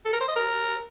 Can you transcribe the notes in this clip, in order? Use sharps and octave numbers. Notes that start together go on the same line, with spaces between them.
A4
A#4
C5
D#5
A#4